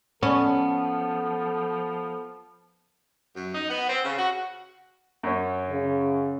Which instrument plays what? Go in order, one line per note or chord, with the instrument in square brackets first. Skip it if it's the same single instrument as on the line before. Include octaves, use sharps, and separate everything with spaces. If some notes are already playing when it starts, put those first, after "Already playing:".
[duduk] F3 [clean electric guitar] B3 [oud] C#4 [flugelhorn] A4
[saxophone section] F#2
D#4
B3
C4
C#3
F#4
[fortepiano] F#2 C#4
[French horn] C#3